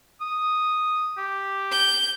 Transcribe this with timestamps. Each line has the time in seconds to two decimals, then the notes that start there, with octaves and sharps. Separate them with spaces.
0.21 D#6
1.18 G4
1.72 G6